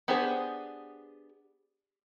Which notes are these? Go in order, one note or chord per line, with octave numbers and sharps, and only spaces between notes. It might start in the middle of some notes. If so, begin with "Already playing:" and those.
B3 D4 G4 G#4 C5